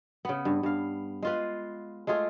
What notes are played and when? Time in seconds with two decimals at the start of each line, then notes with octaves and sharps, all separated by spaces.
0.25 C#3 B3
0.45 G2
0.63 G2 F5
1.22 G#3 F4 B4
2.07 G#3 A3 F4 G#4